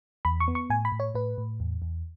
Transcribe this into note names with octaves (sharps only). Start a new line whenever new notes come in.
E2 B5
C#6
B3
C#6
A2 G#5
B5
A2
C#5
A2 B4
A2
E2
E2